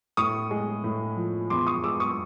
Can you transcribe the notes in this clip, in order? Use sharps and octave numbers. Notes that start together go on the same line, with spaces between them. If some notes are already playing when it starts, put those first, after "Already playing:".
A2 C#6 D#6
G#3
A2
F3
E2 C6 D6
C#6 D#6
G#3 D6 E6
C#6 D#6